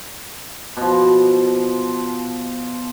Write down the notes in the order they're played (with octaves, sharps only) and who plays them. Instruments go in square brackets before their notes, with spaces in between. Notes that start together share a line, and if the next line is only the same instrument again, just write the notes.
[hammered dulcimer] B2 F3